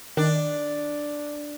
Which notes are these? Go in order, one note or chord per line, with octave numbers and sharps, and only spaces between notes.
D#3 D4